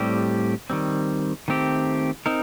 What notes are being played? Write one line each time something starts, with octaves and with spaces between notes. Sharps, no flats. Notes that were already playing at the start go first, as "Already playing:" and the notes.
Already playing: A2 G3 C4 G4
D#3 G3 C4
D#3 A3 C4 G4
C4 D#4 A#4